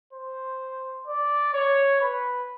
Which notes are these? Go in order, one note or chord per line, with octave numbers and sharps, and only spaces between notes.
C5
D5
C#5
B4